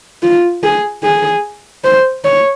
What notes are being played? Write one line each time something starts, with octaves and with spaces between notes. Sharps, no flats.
F4
G#4
G#4
C5
C#5